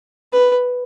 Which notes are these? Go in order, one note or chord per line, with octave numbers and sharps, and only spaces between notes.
B4